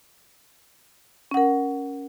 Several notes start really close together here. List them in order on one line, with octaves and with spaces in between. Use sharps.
C#4 F#5 A#4